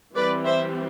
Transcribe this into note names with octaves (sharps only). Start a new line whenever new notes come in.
E3 G3 C4 B4 D5
C5 E5